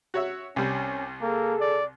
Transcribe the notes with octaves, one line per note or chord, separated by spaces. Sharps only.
F#4 C#5 E5
C2 G3 C#4
A#3 G#4 A4
D5